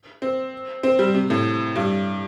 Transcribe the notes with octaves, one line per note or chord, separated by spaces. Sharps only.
C4
C4
G3
C3
A2
G2